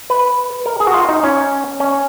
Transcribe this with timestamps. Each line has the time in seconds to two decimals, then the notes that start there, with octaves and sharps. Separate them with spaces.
0.10 B4
0.66 A#4
0.80 G#4
0.87 F#4
0.94 F4
1.09 D#4
1.23 C#4
1.80 C#4